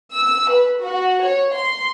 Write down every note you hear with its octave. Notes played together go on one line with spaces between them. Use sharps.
E6
B4
F#4
C#5
C6